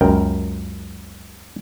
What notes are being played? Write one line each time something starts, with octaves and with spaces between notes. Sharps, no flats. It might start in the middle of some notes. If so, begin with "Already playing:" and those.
C#2 F#2 A#4 G5